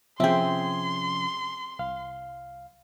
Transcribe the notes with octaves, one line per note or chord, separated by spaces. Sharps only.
C3 F3 C4 C#4 G#4 E5 G5 C6
C2 F5